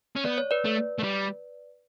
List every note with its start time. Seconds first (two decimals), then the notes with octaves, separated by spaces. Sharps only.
0.16 C#4
0.25 B3 D5
0.38 C#5
0.51 B4 D5
0.65 A3
0.98 A3
1.03 G3